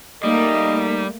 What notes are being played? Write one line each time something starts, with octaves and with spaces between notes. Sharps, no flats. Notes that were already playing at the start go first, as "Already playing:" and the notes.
G3 A3 A#3 D#4 D#5